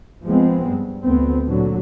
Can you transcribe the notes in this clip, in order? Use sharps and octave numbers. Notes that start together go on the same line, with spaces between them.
F3 G#3 B3 C4
G2
D2 B3 C4
A#2 D3 F#3